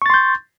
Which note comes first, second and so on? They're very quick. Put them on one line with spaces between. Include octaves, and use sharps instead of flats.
C#6 A6 C6 G6